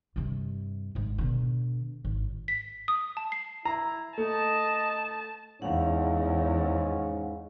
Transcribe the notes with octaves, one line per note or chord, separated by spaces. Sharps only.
G2 C3
G#1 G#2
B2 D3
G#1
B6
D#6
A5
C7
E4 A#5
A3 D#5 A5
E2 G#2 C#4 F5 F#5